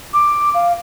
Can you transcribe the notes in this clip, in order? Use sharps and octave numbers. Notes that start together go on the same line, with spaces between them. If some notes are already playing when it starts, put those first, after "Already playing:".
D6
F5